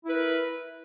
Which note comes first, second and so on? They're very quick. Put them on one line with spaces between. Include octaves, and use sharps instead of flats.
E4 B4 A#4